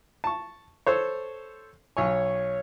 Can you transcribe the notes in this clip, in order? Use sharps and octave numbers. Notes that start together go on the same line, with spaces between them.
A5 C#6
A4 C5 C#5
B1 C#5 G#5